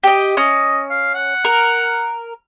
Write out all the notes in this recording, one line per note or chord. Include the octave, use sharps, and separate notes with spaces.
G4 D#5
C#4 D#5
F5
F#5
A#4